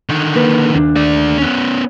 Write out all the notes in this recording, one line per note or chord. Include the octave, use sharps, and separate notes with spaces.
D3 D#3
A#3 B4
D#2 D4
A3 D5
B3 C#4